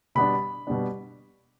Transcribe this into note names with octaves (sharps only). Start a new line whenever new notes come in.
B2 G3 B3 D4 B5
B2 G3 B3 D4